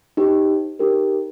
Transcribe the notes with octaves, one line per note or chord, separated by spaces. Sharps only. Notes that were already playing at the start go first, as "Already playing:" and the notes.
D#4 G4 C5
D#4 G4 A#4